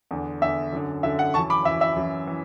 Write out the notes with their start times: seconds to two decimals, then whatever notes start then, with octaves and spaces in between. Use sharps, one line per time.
0.11 E2 D3
0.41 E2 D3 E5
0.73 F#2 D3
1.03 F#2 D3 E5
1.19 F#5
1.34 E3 A5 C#6
1.39 F#2
1.50 B5 D6
1.65 F#2 E3 E5
1.81 E5
1.96 F#2 E3
2.27 E3